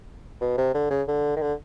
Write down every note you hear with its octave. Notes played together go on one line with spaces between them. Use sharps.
B2
C3
D3
C#3
D3
D#3
D3